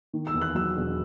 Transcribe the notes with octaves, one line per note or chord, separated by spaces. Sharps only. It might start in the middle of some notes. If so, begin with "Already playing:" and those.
D#3
E6
E2
F#6
F#3 E6
E1